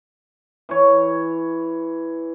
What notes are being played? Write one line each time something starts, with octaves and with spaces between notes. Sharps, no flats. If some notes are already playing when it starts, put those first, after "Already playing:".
E3 C#5